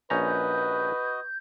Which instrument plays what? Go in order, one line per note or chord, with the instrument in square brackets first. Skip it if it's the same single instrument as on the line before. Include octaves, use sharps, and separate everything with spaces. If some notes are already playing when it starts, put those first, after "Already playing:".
[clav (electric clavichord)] A#1 C#4 A#5 [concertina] F#4 D#5 [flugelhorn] B4 [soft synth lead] G6